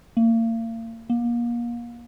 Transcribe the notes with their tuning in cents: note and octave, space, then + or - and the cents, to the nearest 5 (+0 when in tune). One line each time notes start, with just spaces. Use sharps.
A#3 -40
A#3 +30